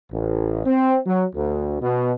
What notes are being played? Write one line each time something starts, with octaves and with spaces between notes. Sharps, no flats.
A1
C4
F#3
D2
B2